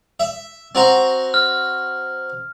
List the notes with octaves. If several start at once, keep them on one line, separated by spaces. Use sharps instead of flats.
E5
C4 F#4 A#5
F6